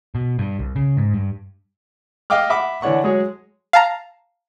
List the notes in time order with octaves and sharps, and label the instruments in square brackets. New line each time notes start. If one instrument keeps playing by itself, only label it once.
[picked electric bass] B2
G2
C2
C#3
G#2
G2
[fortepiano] D#5 F5 G5 D6 F6
E5 F#5 B5 D6
D3 E3 D4 C#5 F#5 C#6
F#3 G#3 G#4 C#5
[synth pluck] F5 A5 A#5